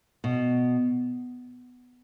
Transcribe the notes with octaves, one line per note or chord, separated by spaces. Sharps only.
B2